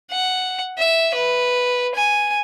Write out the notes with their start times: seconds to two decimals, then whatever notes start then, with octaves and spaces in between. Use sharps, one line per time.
0.11 F#5
0.78 E5
1.15 B4
1.95 G#5